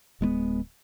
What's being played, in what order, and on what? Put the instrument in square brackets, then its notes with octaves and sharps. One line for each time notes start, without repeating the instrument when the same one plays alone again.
[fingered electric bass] D1 G#3 A#3 B3